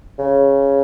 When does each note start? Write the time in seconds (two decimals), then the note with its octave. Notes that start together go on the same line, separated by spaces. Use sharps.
0.19 C#3